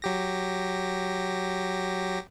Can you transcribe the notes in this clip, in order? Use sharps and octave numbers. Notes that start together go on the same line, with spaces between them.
F#3 G4 A#6